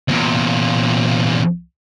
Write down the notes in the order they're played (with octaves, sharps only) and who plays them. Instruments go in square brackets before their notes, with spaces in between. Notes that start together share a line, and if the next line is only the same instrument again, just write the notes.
[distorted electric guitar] E2 A#2